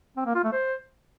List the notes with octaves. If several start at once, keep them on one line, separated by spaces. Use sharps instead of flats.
C4
A#3
F4
A3
C5